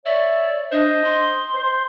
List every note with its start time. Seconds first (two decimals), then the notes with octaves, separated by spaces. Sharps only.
0.06 C#5 D5 E5
0.72 D4 C5 D#5
1.04 C6
1.54 C5